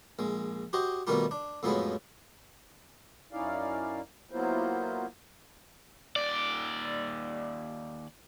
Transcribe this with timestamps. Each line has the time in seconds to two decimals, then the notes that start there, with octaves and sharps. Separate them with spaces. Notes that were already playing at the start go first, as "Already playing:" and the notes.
0.19 A#1 G#3
0.73 F#4 G4 C5 D#5
1.07 B2 D#3 G3 A3 A#3 F4
1.31 D4
1.63 F2 A2 F3 F#3 G#3 B3
3.33 F#2 C#4 D#4 E4 D5 F5
4.32 F#3 A#3 B3 E4 F4 C5
6.16 D#2 D5